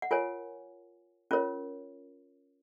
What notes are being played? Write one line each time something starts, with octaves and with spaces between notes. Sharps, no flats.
F#5
F4 A#4 C#5 G#5
C#4 F4 A#4 C#5